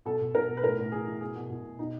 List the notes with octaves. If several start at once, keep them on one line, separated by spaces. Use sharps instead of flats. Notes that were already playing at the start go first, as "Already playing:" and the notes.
B2 A4
B2
B2 A#4
B2
B4
A2 A#4
A2
E3 G#4
E3
B2 G#4
B2
B2
B2
B2 D#4